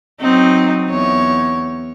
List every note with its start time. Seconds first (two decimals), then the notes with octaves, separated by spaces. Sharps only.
0.20 F#3 C4 D#4
0.88 E2 C#5